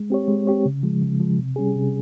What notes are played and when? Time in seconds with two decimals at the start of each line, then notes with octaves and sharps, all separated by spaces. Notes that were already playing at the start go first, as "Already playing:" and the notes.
Already playing: G#3
0.10 C4 G4 C#5
0.28 G#3
0.47 C4 G4 C#5
0.65 C#3
0.83 F3 G#3
1.02 C#3
1.20 F3 G#3
1.39 C3
1.56 G3 C#4 G#4
1.75 C3